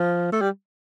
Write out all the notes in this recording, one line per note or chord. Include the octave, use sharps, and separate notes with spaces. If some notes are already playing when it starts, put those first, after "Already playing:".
Already playing: F3
A3
G3